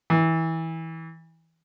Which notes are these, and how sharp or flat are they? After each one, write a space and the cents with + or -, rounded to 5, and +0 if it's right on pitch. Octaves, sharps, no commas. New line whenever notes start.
E3 -20